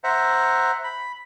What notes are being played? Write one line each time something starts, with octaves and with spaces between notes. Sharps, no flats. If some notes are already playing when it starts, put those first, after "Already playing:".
C5 E5 F#5 A#5
B5